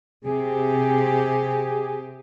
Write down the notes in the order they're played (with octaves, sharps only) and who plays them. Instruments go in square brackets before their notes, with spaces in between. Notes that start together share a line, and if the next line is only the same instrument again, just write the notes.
[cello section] C3 G4 [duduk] G#4